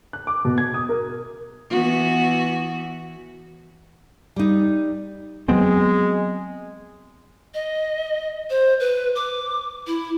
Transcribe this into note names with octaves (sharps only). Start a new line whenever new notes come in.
F#6
D6
B2
G#6
D#6
A#4
E3 B3 F#4
G3 D#4
F#3 G#3 B3 C4
D#5
C5
B4
D6
E4